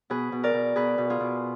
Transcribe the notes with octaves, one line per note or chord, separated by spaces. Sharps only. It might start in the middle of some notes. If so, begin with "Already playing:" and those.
B2 G#4 B4
B2
A#4 D5
B2
B2 G#4 B4
B2
F4 G#4
B2